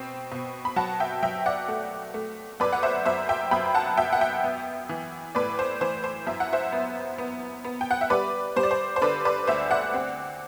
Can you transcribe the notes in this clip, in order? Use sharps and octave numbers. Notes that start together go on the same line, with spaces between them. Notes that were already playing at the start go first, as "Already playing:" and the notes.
Already playing: B2 C4
B2
B5
F#3 F#5 A5
E5 G5
F#3 E5 G5
D5 F#5
A3
A3
F#2 B4 D5
F#5
C5 E5
F#2 C5 E5
E5 G5
F#2 G5 B5
F#5 A5
F#2 E5 G5
F#5
E5 G5
B3
E3
A2 B4 D5
C5
E3 C5
C5
F#2 E5
F#5
C5 E5
B3
B3
B3
G5
F#5
E5
G3 B4 D5
G3 C5
D5
C5
C5
D3 B4 D5
B4 D5
D2 C5 E5
D5 F#5
C4